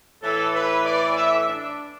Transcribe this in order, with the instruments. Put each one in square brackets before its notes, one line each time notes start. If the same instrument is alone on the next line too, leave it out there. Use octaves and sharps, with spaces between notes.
[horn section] A2 E3 A4
B4
D5
E5
D4